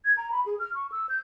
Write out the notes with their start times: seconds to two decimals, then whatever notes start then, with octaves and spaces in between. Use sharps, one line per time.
0.05 G#6
0.17 A#5
0.32 B5
0.46 G#4
0.59 F6
0.75 C#6
0.92 E6
1.09 G6